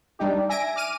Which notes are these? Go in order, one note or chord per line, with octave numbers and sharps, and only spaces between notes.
G3 D4 D#4 G4
E5 G#5 A#6 D7
D6 F6 D#7